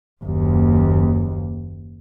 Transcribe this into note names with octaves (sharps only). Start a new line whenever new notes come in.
F#1 D#2